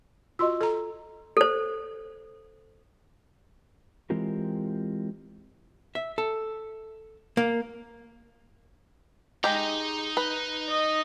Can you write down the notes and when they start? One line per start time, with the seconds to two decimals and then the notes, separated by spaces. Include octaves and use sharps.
0.39 F4 F#4 D#5 C6 E6
0.61 A4 A#5
1.37 A4 C5
4.10 E3 G#3 C4 F4 G4 A#4
5.95 E5
6.18 A4
7.37 A#3
9.44 G#3 D#4 G4 A#5
10.17 B4
10.70 D#5